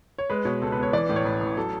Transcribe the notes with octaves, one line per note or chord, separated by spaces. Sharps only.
C#5
G#3 B4
B2 C#5
C#2 A4
B3 B4
C#5
E3 D5
A2
C#5
A1 B4
A1
F#3 A4